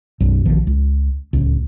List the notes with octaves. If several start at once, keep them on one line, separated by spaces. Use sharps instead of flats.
B1 F#2
A#1 D#3 F3
C#2
D1 C#2